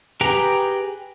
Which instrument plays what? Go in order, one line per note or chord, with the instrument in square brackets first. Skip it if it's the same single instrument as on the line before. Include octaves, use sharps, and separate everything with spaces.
[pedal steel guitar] G4 G#4 B4 G5 A#5